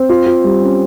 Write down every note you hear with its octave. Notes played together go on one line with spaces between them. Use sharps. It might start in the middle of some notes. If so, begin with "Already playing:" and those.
Already playing: C4
F4
F4
G3
C#4